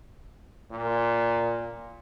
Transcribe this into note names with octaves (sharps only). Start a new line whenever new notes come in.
A#2